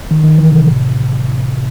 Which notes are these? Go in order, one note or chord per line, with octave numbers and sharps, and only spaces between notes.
D#3
D#3
E3
C3
A2